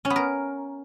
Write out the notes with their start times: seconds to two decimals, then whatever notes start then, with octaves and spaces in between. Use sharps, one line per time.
0.05 C#4
0.10 B3
0.16 A#4